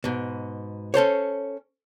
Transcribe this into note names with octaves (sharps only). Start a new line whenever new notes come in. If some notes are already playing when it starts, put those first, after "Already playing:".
G#2 B2
C#4 A4 C5 C#5